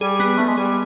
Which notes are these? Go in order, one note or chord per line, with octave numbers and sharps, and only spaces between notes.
G3 G#4
B3
A3 B3
G#3
G3 G#4